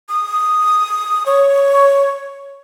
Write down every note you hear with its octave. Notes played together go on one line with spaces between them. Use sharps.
D#6
C#5